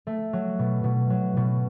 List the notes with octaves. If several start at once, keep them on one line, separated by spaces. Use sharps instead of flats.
A3
F#3
B2
B2
F#3
B2